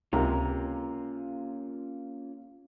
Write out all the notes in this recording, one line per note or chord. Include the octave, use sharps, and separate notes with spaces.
C#2 C3 A#3 C#4 F4 A#4